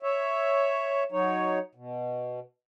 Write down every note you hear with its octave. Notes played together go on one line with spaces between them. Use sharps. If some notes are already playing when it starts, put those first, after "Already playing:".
C#5 E5
F#3 D#4 C#5
B2